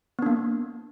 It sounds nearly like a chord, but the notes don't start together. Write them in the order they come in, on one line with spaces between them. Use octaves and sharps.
B3 D4 A#3